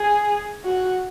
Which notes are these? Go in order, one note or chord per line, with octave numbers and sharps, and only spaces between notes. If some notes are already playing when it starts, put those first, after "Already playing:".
Already playing: G#4
F#4